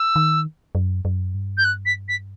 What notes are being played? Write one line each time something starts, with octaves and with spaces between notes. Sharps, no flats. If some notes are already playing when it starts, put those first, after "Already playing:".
Already playing: E6
D#3
F#2
F#2
G2
G6
F#6
B6
B6